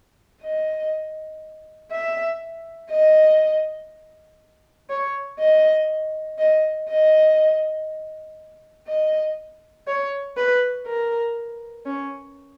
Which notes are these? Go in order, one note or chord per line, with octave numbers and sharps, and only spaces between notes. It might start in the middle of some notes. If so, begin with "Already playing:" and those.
D#5
E5
D#5
C#5
D#5
D#5
D#5
D#5
C#5
B4
A#4
C#4